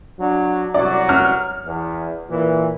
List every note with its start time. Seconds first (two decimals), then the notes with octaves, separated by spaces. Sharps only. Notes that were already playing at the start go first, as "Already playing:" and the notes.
0.19 F#3 D4
0.74 C2 F#3 D5
1.09 F6
1.64 E2
2.29 A#2 E3